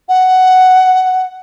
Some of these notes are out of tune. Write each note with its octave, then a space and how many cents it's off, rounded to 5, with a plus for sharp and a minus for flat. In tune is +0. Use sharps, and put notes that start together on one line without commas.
F#5 +10